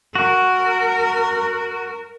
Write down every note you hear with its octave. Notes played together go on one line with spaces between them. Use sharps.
F#4 A#4